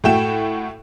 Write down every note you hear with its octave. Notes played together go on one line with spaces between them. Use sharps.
A2 A3 F#4 G5 E7